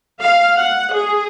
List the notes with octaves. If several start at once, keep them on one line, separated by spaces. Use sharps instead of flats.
F5
F#5
G#4